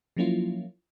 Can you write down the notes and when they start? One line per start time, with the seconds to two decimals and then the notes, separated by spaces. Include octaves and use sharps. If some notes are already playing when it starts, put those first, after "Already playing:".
0.17 F3 F#3 A#3 C#4 E4 F4